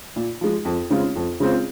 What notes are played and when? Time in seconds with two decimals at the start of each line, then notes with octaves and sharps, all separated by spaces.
0.16 A#2
0.41 F3 G#3
0.65 F2
0.90 C#3 G#3 C4 F4
1.16 F2
1.40 C#3 G#3 C4 F4